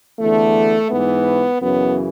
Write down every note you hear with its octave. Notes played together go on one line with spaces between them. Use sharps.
E2 D3 A3
G#2 E3 B3
F#2 C#3 E3 B3